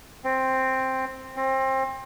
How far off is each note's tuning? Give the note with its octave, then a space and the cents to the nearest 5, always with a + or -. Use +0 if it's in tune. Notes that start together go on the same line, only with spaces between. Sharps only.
C4 +5
C4 +25